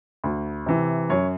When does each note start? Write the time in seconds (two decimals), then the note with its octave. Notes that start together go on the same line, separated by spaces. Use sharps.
0.24 D2
0.66 C3 E3
1.10 F#2 C#5